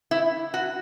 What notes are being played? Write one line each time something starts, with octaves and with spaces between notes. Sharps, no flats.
E4
F#4